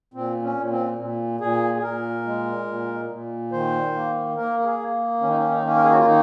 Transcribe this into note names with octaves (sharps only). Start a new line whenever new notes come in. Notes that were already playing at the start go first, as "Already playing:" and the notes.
A#2 C4
C#4
A#2
C4
A#2
A#2 G#4
G#4
A#2 A#4
G#3
A#2
A#2
D#3 C5
A#3
A#3 A#4
A#4
G#4
A#3
D#3 C#4
D#4
C#4
D#4
A#3 C#4
A#4
G#4
F#4
F4
D#3 D#4